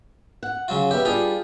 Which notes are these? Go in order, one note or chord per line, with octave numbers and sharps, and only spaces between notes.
F#5
C#3 F#3 F4
G3 B3 G4 E5
G3 D4 F4 G4 G#4